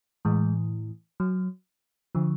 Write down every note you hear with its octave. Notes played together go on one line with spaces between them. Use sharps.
A2 E3 G#3
F#3
D3 F3